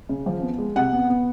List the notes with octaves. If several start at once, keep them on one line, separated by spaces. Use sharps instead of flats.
C#3
F3
B3
G#3
C3 F#5
B3
B3